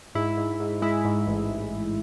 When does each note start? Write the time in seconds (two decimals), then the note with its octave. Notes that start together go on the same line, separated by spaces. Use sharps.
0.15 G#2 E4
0.37 G#2
0.60 G#2
0.82 G#3 E4
1.05 G#2
1.27 A1